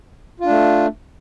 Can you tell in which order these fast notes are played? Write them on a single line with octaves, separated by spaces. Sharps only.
F4 D4 A3